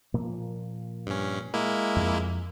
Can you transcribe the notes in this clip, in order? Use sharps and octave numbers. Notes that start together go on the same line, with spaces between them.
A#2 F3 A#3
G2 C#4
G#3 A#3 E4
F2